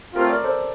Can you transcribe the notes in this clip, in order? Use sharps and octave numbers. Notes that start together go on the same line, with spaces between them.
A3 C4 F4 G4 A#4
A#4 D5
A4 C5